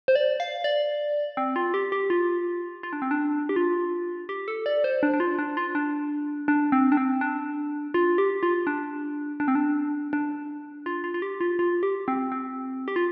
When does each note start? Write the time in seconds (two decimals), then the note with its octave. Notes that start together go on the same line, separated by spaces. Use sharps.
0.08 C5
0.16 D5
0.40 F5
0.64 D5
1.37 C4
1.56 F4
1.74 G4
1.92 G4
2.10 F4
2.83 F4
2.93 D4
3.02 C4
3.11 D4
3.49 G4
3.56 F4
4.29 G4
4.48 A4
4.66 D5
4.84 C5
5.03 D4
5.14 D4
5.20 F4
5.39 D4
5.57 F4
5.75 D4
6.48 D4
6.72 C4
6.92 D4
6.97 C4
7.21 D4
7.94 F4
8.18 G4
8.43 F4
8.67 D4
9.40 D4
9.48 C4
9.55 D4
10.13 D4
10.86 F4
11.04 F4
11.14 F4
11.22 G4
11.41 F4
11.59 F4
11.83 G4
12.08 C4
12.32 C4
12.88 G4
12.96 F4